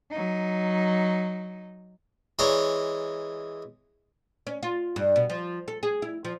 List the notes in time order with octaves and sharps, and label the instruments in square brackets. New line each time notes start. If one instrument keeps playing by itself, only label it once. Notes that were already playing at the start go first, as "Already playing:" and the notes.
[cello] F#3 D#4
[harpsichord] E3 G#3 C#5 D5 A#5 C6
[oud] C#4
F4
G2
B2
F3
A4
G#4
E4
F3